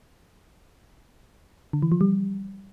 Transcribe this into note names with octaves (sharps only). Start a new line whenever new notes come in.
D3
E3
F3
G3